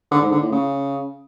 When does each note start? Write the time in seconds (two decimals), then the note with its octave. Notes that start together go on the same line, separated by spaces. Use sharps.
0.11 D3
0.21 G#2
0.32 D3
0.42 A2
0.52 C#3